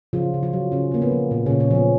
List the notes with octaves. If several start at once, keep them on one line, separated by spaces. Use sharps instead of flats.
C#3 F3 F4
C#3
F3 F4
F#3
C#3 C#4
C#3 A#3
B3
F3
A#2 B3
C#3 C#4
A#2
C#3 C#4
F3 B3